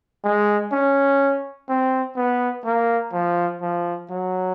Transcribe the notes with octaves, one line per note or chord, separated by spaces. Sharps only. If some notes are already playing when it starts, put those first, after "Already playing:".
G#3
C#4
C4
B3
A#3
F3
F3
F#3